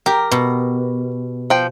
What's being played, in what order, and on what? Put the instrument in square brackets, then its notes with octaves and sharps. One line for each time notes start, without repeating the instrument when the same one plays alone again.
[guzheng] G4 [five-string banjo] A#4
[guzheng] B2
[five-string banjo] F3 G5